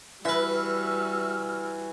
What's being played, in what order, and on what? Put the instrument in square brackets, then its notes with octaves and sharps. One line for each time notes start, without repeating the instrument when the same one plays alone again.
[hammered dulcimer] E3 [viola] G3 F#4 [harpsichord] B4 E5 [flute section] E6 F6